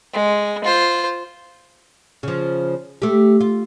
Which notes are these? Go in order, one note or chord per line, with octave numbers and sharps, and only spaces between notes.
G#3
F4 C5
C#3 F3
A3 G4
F4